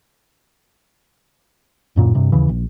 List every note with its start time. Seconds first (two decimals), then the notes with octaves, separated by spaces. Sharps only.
1.96 D1 F#2 A#2
2.15 G2 C3
2.32 D#2 C#3 E3
2.49 A#1